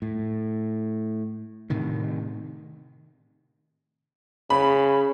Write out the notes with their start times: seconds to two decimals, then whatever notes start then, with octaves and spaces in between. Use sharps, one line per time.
0.02 A2
1.70 A2 C3 D#3
4.50 C#3 B5